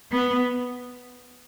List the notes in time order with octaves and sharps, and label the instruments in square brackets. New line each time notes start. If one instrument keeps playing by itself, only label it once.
[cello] B3